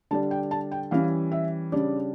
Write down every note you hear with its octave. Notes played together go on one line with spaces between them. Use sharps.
D3 G3 D4 A5
G5
A5
G5
E3 G3 C#4 F5
E5
C#3 G3 D4 D5